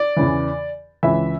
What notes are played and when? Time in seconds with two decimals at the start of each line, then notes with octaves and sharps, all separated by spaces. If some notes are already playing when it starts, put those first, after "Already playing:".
Already playing: D5
0.17 E2 C#3 E3
1.03 C#2 C#3 E3 E5